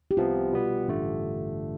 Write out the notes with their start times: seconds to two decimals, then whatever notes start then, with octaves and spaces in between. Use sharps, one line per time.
0.11 G4
0.17 C2 C3 F3 B3 F4
0.52 B2 G3 B3
0.87 A1 G2 D3 A3